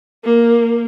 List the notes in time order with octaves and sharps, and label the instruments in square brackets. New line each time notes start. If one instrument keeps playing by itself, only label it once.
[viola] A#3